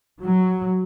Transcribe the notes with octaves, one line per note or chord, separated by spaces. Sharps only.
F#3